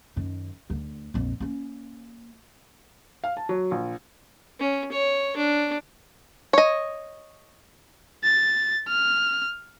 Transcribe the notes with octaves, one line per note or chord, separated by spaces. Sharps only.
F#2 D#3
D2 D3
A#1 F2
A#3 C#4
F5
A5
F#3
A#1
C#4
C#5
D4
C#5 D#5
A6
F6